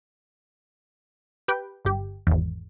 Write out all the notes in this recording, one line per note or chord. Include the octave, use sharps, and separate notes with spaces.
G4 B4 G5
G1 G4
G#1 E2